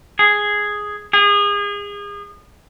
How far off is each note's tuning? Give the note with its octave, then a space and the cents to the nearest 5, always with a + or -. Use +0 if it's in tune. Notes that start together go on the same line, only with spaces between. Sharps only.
G#4 +0
G#4 -30